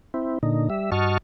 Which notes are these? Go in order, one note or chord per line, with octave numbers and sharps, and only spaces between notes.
C4 E4
A#2 D3 D#4
G3 E5
G2 F#4 D#5 A5 C#6 F6